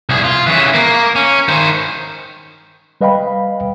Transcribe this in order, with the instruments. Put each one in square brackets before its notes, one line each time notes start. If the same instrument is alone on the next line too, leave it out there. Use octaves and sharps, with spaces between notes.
[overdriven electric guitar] C2 G#4
F4
C#3 E3
A#3
C#4
D#3 C5
[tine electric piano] G3 B4 D#5 F5 G5 B5